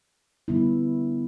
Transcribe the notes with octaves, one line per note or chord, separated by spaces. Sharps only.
D3 G3 B3 E4